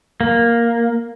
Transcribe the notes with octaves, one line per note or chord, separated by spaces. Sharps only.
A#3